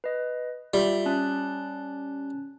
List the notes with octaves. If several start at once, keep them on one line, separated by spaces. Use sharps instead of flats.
B4 D#5
G3 F4 E5
C#4 A5 F#6